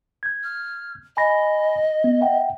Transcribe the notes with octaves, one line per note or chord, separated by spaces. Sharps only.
G6 G#6
F6
D#5 G#5 B5 A#6
B3
E5 F#5 G5